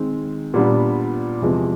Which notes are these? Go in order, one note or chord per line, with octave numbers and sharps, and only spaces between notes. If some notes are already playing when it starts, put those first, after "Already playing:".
Already playing: D#3 G#3 C4
A#2 G3 B3 D4
E2 C3 F3 G#3